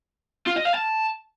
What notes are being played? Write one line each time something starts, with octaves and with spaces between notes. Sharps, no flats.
F4
D#5
F5
A5